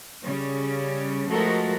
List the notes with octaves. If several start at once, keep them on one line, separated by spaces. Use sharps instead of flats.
C#3 G3 C#4
F3 G#3 A3 F#4 A4 A#4